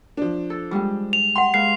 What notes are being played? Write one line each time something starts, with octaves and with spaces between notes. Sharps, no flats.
F3 D4
A4
G3 G#3 G#4 G5
F7
F#5 G5 C6
G#3 B4 F5 C7